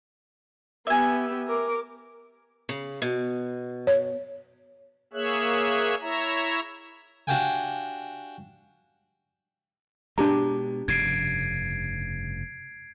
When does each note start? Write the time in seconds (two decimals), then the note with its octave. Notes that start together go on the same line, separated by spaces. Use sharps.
0.87 B3 G4 E5 G#5
1.47 A#4 D6
2.69 C#3
3.02 B2
3.87 C#5
5.13 A#3 G#4 C#5 E5 F#6
6.01 E4 C#5 E5 A#5
7.27 D4 F#4 G4 F5 G5 G#5
10.18 B2 G#3 D4 G4 A#5
10.88 F1 G2 C#3 G#6 C7 D7